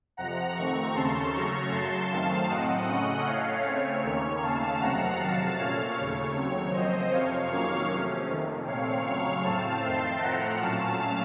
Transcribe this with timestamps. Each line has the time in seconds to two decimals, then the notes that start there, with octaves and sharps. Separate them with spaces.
0.17 F2 C3 F3 F#5 A#5
0.56 F2 D#3 A3 C4 A#5 C#6
0.95 D#2 C#3 A3 C#4 A5 C6
1.33 C#3 F#3 A3 C#4 A#5 C#6
1.72 F#2 C#3 F#3 A5 C6
2.10 F#2 D#3 A3 C4 F5 A5
2.49 A2 F#3 C4 D#5 F#5
2.88 C#3 A3 C#4 D#5 F#5
3.26 A2 A3 C#4 C#5 F5
3.65 C#3 A3 C4 C#5
4.03 D#2 D#3 A#3 C#4 C#5
4.42 D#2 C#3 A3 C#4 F5 A5
4.80 F2 C3 D#3 F#3 F#5 A#5
5.19 F2 C3 F#3 F5 A5
5.58 A#2 A3 C#4 C#5 F5
5.97 D#2 C#3 A3 C#5
6.36 D#2 C#3 F#3 C4 C#5
6.73 F#2 F3 C4 C5 D#5
7.12 F2 C3 F3 C#5 F5
7.51 F2 D#3 F#3 A#3 C#4 C#5 F5
7.90 C3 F3 A3 C#4
8.29 F2 C3 D#3
8.67 A#2 A3 C4 C#5 F5
9.06 F2 C#3 F#3 C#5 F5
9.44 A2 A3 C4 F5 A5
9.83 F2 D#3 A3 C4 A5 C6
10.21 A2 F3 A3 C4 F#5 A#5
10.60 A#2 F#3 A3 C#4 F5 A5